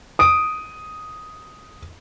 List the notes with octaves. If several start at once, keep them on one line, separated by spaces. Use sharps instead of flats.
D#6 D7